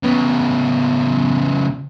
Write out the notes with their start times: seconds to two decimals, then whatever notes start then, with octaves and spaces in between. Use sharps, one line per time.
0.03 C#3 B3